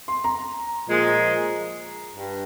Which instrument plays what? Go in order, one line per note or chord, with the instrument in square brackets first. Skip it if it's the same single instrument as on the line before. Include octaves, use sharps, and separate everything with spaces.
[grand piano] C6
A#5
[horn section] A#2 F3 G#3
G2